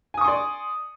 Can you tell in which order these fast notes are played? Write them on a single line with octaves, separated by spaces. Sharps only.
G#5 D#6 C#6 C6 D5